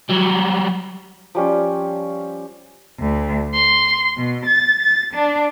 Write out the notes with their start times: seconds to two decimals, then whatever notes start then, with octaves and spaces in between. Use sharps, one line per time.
0.10 F#3 G3
1.35 F3 G3 C#4
2.98 D2
3.53 C6
4.16 B2
4.46 A6
4.82 A6
5.13 D4